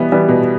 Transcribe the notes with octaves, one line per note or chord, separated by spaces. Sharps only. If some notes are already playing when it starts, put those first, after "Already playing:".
Already playing: B2 E3 G3 B3
E3 G3 B3
B2